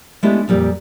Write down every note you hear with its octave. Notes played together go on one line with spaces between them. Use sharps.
G#3 A3 B3 D4 E4 G4
F2 A#2 G3 G4